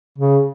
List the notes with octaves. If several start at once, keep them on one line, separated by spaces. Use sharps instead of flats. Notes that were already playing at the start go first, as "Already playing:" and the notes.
C#3